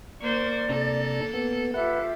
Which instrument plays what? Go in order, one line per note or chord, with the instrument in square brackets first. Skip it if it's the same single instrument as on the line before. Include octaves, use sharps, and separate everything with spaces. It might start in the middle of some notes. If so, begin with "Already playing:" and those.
[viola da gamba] A#3 A#4 C5 [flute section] D5 [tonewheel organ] C#6
[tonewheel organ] C3 D4 A#5 [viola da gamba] A#3 A4
[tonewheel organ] B3
[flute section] F4 G4 E5 [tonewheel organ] B4 F#5